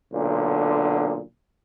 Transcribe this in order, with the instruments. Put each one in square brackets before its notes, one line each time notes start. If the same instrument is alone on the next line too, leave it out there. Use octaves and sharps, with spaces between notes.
[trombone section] B1 A#2 D3